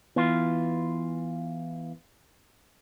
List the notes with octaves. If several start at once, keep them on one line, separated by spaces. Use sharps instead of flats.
E3 B3 F4